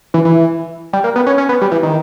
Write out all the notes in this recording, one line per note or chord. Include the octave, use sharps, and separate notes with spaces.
E3
E3
G3
A#3
B3
C#4
C#4
B3
G3
E3
D#3